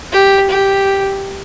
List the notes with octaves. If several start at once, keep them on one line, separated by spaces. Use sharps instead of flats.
G4
G4